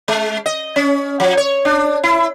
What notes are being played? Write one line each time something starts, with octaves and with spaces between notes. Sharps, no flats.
G#3
D#5
C#4
F3
C#5
D4
E4